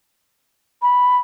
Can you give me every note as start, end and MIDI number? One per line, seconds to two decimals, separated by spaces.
0.82 1.17 83